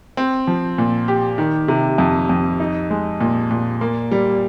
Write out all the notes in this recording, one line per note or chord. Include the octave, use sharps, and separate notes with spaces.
C4
F3
A#2
G4
D#3
C3
F2
F2
D#4
G#3
A#2
A#2
A#3
G3